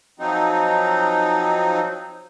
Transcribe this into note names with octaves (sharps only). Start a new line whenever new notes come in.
F3 F#3 C4 D#4